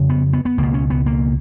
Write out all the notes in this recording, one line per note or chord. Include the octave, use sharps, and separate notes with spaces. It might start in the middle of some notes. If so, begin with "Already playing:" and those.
Already playing: F2 C#3
B3
B3
B3
C#2 B2 A#3
C#4
B3
A#3